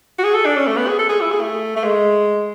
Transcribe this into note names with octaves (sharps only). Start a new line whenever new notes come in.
F#4
G#4
A4
D4
C#4
A3
B3
G#4
A4
G#4
E4
G#4
A3
A3
G#3